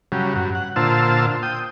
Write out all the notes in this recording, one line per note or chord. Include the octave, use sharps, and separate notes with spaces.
C#3 F#3 G3
G2 F#3
F#5
A#2 D3 F4 C5 A5 E6
G5 D#6